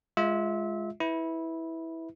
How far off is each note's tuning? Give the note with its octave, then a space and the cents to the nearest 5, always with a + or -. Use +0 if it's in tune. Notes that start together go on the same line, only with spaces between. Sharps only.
G#3 +0 F4 +0 E5 -25
E4 -15 B4 +0